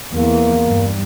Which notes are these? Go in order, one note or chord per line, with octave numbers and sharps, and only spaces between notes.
E2 E3 A#3
G2 G3